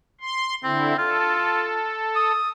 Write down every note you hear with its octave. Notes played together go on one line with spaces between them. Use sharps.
C6
D3 C4 E4
F4 A4
D#6